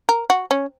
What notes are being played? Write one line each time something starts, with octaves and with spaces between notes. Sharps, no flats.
A#4
F#4
C#4